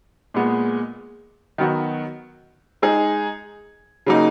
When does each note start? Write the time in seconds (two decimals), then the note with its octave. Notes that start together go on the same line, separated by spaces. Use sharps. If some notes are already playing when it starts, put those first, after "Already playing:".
0.34 A#2 G#3 B3
1.58 D#3 F#3 B3 F#4
2.82 G#3 D#4 G#4
4.06 C#3 F#3 A#3 D#4